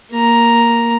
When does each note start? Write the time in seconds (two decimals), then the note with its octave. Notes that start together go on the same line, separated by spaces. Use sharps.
0.12 A#3 A#5